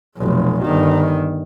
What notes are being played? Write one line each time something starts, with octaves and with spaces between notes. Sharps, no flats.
F1 B1
G1 D#3